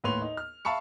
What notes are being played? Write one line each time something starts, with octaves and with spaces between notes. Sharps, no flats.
D#2 A2 B4 C#5 C6 F7
D#4
F6
E5 F5 A5 B5 C#6 C#7